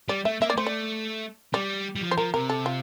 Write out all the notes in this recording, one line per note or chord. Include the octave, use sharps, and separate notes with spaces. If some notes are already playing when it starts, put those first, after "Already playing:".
G3 D5
A3 E5
A#3 E5
D5
A3 C5
D5
G3 D5
G3
F3
C5
F3 A#4
C3 A#4
A4
F4